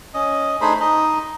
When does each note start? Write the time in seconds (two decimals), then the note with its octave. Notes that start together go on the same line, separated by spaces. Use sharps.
0.14 C#4 D#5
0.61 A3 D4 D#4 G#4 C5 B5
0.80 D#4 D#5